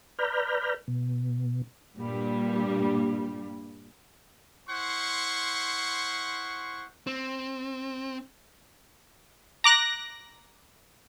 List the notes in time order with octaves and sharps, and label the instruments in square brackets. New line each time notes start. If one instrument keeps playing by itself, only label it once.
[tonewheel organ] B4 D5 A#5 B5 F6 G6
B2
[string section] G2 A#2 G3
[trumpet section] E4 C5 F#5 C6 C#6
[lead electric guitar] C4
[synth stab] A#5 D6 F#6 A#6